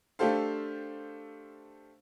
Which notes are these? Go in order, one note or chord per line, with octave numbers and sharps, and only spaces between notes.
A3 D4 G4 A4 C5 F5